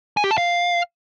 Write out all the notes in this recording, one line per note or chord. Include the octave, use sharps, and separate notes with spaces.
G#5
G4
A5
F5